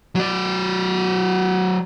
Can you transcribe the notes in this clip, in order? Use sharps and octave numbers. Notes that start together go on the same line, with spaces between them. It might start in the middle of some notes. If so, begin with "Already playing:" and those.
F#3 D5